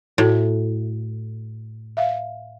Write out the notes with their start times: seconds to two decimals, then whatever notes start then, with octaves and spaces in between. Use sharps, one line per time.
0.18 A2 F#4 A4
1.97 E5 F5